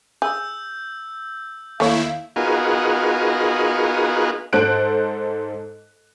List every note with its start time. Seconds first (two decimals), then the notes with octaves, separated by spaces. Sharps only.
0.22 G#4 E6 G6
1.80 D#2 A3 E4 C#5 F5
2.36 B3 D#4 F4 F#4 G#4 A#4
4.53 G#2 A4 C5 F#6 D7